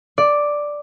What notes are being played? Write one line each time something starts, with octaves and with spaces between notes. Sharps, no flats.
D5